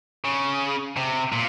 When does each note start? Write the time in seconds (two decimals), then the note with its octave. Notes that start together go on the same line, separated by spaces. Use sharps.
0.25 C#3
0.97 C3
1.32 A#2